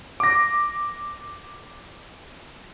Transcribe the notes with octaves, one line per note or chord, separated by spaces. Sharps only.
D6 A#6